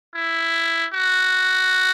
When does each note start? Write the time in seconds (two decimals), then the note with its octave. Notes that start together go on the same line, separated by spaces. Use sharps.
0.15 E4
0.94 F#4